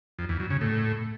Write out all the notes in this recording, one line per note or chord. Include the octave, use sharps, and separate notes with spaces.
F2
E2
F#2
C#3
A2